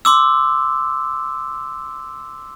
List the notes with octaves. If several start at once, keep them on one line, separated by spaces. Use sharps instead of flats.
C6 D6 E6